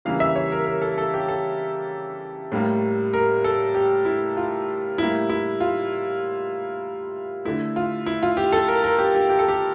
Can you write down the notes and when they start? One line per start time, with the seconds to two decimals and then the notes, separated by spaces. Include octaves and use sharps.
0.05 C#3 E3 G3 A#3 F5
0.20 E5
0.36 C#5
0.52 A#4
0.66 A#4
0.82 A4
0.98 A4
1.14 G4
1.28 A4
2.52 A2 G3 A#3
3.14 A#4
3.44 A4
3.75 G4
4.05 E4
4.37 F4
4.98 A2 G3 A#3 E4
5.30 E4
5.61 F4
7.45 D3 A3 E4
7.76 F4
8.06 E4
8.23 F4
8.37 G4
8.52 A4
8.68 A#4
8.84 A#4
8.99 G4
9.15 G4
9.29 G4
9.39 A4
9.48 G4